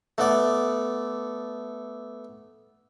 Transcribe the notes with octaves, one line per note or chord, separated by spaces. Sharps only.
A3 B3 D5